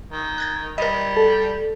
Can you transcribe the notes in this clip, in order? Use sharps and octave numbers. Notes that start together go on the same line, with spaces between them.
D#3
F#6 G#6 A6
G3 A#4 D#5
A4